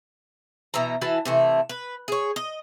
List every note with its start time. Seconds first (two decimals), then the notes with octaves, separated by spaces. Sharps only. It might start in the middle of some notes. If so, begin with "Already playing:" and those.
0.74 B2 E3 E5 A#5
1.01 E3 E4 F#4 A5
1.25 C3 E3 A3
1.70 B4
2.08 G#4 C#5
2.36 D#5